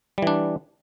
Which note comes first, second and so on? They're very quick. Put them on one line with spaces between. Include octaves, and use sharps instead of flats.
G3 E3 D4